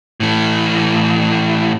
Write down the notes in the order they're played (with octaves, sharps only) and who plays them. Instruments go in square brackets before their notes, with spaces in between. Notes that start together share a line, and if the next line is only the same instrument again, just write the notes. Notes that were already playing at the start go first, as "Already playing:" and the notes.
[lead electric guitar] A2 E3